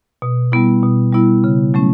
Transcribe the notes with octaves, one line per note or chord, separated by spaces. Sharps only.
B2
G3 B3 E4
B2
G3 B3 E4
C#3
F#3 A3 C#4